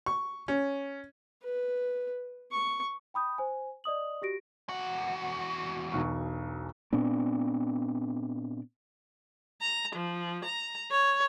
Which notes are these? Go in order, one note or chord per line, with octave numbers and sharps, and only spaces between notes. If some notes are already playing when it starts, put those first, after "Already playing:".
C#6
C#4
B4
C#6
G5 B5 D#6 G6
C5 G#5
D5 D#5 D#6 F#7
F#4 G4 A#6 D7
E2 F#4
E1 B1 C#6
A#2 B3 C4 D4
A#5
F3
A#5
C#5